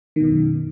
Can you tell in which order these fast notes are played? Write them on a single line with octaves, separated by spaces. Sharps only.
D#3 B2 F#2